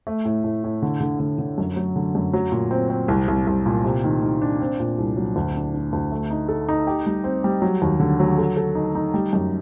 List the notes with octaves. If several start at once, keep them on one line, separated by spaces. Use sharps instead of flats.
A3
A2
A2
A2
D3
D3
D3
D3
F#2
F#3
D3
F#2
F#3
A#2
C4
C4
C2
C2
C2
A#2
C3
D#3
D#3
D4
C4
A#2
C2
F#3
D2
D4
D4
D2
A3
D#4
A4
D#4
G4
G3
C4
G3
F#3
D#2
D3
F#3
A4
A4
D#4
D#4
G3
F#2